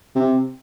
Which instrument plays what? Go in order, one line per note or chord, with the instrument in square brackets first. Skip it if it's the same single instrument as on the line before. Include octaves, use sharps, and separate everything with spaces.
[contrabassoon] C3